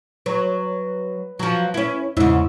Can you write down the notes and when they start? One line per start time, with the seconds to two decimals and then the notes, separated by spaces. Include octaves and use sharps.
0.26 F#3 B4
1.39 F3 F#3
1.74 C#4 E4
2.17 E2 G#2 C#3 E4 E6